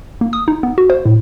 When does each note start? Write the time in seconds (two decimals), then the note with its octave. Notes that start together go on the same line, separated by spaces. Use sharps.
0.21 A#3
0.33 D#6
0.48 D#4
0.63 B3
0.78 F#4
0.90 C5
1.06 A2